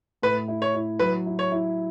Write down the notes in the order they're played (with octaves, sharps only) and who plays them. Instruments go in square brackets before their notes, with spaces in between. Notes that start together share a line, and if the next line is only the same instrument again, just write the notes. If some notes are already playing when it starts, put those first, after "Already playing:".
[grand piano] A2 [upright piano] B4
[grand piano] E4
[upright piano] C#5
[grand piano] E4
[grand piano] F#3 [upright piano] B4
[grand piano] E4
[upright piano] C#5
[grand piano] E4